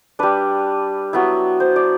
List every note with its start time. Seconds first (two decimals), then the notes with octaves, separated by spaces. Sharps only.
0.19 G3 D4 B4
1.13 F#3 B3 E4
1.60 C5
1.76 D5